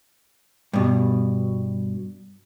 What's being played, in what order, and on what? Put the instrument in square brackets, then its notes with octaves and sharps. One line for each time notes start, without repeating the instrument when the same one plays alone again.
[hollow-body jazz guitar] G2 B2